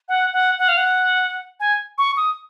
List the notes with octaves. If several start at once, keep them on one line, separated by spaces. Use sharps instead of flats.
F#5
F#5
F#5
F5
F#5
G#5
C#6
D#6